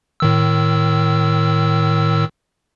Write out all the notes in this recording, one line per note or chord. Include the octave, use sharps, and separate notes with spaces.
A2 D#3 E6